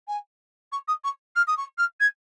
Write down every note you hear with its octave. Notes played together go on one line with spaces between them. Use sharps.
G#5
C#6
D#6
C#6
F6
D#6
C#6
F6
G#6